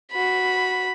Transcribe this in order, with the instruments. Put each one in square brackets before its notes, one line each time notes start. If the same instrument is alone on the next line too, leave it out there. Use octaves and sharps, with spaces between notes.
[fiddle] F#4 B5